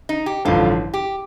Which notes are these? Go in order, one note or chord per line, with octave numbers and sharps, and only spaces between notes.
D#4
G4
A1 G2 D3 F3 F4
G4